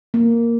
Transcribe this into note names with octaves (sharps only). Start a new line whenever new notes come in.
A#3